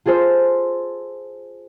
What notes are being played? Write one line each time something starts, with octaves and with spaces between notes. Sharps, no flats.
F4 G#4 A4 C5